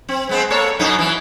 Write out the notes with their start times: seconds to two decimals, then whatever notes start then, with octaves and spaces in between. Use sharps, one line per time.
0.09 C4
0.29 G#3 B3 C4
0.50 A#3 A4 C#5
0.79 F#2 B2 D#4
0.99 E3